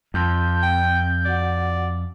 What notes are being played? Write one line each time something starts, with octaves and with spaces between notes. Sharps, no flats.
F2 F4 A5 C6 G6
C4 G5
F#4 D5 F#5